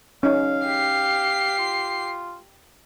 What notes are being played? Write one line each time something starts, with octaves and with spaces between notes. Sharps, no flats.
C#4 D#4 F5
G4 C7
F4